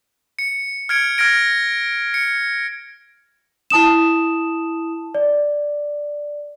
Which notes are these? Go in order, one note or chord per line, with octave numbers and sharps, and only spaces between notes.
C#7
F6 G#6 C#7 D7
F6 G#6 A#6 D7
C#7
E4 A5 D#6 E7
D5